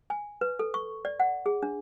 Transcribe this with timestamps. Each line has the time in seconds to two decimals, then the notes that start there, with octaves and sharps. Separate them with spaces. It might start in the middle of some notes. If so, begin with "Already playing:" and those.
0.10 G#5
0.41 B4
0.59 A4
0.74 C#6
1.05 D5
1.20 F#5
1.46 G#4
1.63 D4